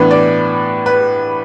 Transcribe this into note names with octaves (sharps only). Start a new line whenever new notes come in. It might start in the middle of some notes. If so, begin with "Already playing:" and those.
Already playing: A2 E3 B3 D4 B4
D5
B4